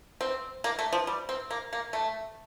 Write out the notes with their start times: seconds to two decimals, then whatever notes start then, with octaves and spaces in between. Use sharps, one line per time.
0.21 C4
0.64 A#3
0.79 A3
0.92 F3
1.07 G3
1.29 C4
1.50 A#3
1.73 A#3
1.93 A3